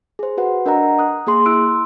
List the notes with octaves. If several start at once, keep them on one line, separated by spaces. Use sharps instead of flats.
G#4 C5
F#4 B4 F#5
D4 A#4 D#5 F#5 A#5
D#6 F#6
A#3 G#4 C6
E4 C6 E6 F#6 D7